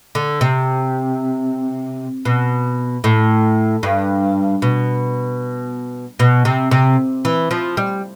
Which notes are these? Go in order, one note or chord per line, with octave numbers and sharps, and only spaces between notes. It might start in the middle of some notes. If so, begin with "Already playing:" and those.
D3
C3
B2
A2
G2
B2
B2
C3
C3
E3
F3
G3